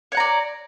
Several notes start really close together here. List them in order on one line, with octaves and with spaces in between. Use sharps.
C#5 F#5 A#5 D5